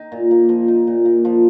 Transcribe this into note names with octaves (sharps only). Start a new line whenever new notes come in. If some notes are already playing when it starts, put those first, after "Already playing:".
Already playing: D#4
A#2
A#3
F3
D#4
A#2
A#3
F3